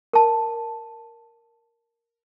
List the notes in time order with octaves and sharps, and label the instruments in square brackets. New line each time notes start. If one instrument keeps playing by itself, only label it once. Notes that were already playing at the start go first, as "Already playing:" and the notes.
[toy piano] A#4 A5